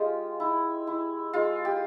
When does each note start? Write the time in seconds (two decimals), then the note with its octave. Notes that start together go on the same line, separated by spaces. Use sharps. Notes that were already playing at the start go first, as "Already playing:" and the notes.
Already playing: G#3 F4 G4
0.40 E4
0.87 E4
1.33 G#3 F4
1.65 G4